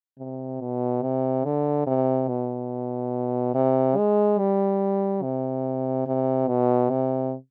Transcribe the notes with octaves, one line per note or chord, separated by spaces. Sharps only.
C3
B2
C3
D3
C3
B2
C3
G#3
G3
C3
C3
B2
C3